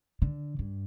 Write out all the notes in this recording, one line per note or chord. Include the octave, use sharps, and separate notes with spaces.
D3
G2